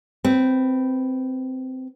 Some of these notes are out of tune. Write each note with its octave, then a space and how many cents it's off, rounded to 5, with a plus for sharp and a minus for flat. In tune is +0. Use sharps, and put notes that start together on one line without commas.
C4 -15 B4 +0